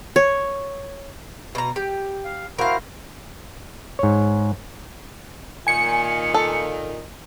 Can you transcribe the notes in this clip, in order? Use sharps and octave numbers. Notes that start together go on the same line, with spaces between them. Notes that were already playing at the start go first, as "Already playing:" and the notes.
C#5
B2 A#5
G4
F5
E4 F#4 A#4 C5 F5
G#2 C#5
A#2 D#3 G#5 C#7
A4